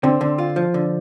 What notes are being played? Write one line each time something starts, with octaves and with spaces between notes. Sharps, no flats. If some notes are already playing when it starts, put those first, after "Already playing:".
D3 C4
D3
F4
F3
D3